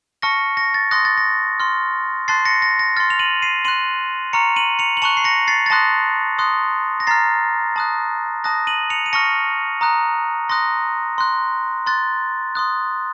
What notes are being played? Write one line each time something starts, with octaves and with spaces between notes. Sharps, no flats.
A5 C#6 F6 A#6 C#7
A#6
A6
C6 D#6 F#6 A#6
A6
A#6
C6 F6
A5 C6 F#6 A6 C7
A#6 C#7
A#6
A#6
C6 F6 A6
F7
D#7 F#7
C7 D#7
C6 F#6 D#7 F#7
A#5 C#6 F6 C#7 F7
D#7 F#7
C#7 F7
F#7
A5 C#6 F#6 C#7 F7
C7
A#6 C#7
A6 C7
A6
A5 C6 D#6 F#6 A#6
C6 D#6 F#6
A#6
A#5 F6 A6 C7
A5 D#6 F#6
A5 D#6 F#6 A#6
D#7 F#7
C#7 F7
D#7
A5 C#6 F6 A#6 C#7
A#5 D#6 F#6
C6 D#6 F#6 A#6
C6 F#6
C6 F#6 A6
C6 D#6 F#6